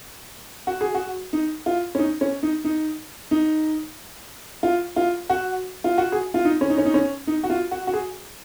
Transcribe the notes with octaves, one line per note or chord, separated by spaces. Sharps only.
F#4
G#4
F#4
D#4
F4
C#4
D#4
C#4
D#4
D#4
D#4
F4
F4
F#4
F4
F#4
G#4
F4
D#4
C#4
D#4
C#4
D#4
C#4
D#4
F#4
F4
F#4
F#4
G#4